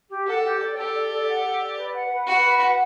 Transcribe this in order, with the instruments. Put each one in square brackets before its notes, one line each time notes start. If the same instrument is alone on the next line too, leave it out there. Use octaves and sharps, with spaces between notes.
[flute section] G4
[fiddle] A4 [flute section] F#5
[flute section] G4
D5
[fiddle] G4 [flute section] A4
[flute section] D5
A4
F#5
A4
D5
B4
F#5
B4
[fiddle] F#4 [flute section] B5
[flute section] B4
F#5